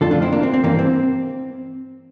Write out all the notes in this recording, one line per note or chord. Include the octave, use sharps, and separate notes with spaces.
F2 D3 A3 F4 A4
D4 F4
C4 E4
A#3 D4
C4
C4
G2 E3 G3 A#3
C4